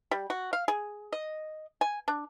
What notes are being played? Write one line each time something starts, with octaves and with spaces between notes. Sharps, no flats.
G3
F#4
F5
G#4
D#5
G#5
D4